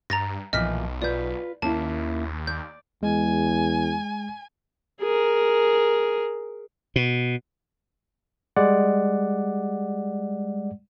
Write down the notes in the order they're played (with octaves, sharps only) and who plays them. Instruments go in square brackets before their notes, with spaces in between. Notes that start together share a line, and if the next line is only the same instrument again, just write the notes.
[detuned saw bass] G2 [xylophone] A#5 A6 A#6
[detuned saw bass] B1 [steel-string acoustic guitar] A#2 E3 F3 [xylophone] D#5 F6 B6
[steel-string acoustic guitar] F4 B4 [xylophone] D5 G6
[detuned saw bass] D#2 [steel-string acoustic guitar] A#3 C#4 E4 [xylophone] A5
[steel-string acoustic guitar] D5 [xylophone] G6
[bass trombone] E2 [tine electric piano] G#3 [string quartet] G#5
[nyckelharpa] G#4 A#4
[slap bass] B2
[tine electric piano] G3 G#3 D5 F#5